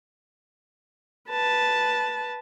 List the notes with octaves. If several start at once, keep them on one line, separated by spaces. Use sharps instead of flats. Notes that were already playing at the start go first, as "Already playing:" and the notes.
B4 A5